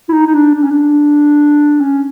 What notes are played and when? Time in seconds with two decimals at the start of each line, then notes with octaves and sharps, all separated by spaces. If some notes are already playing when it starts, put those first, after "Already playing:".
0.09 E4
0.13 D#4
0.27 D#4
0.34 D4
0.55 D4
0.63 C#4
0.71 D4
1.81 C#4